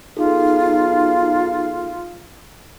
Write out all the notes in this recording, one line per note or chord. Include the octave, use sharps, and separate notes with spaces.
B1 D#4 F4 G#4 A4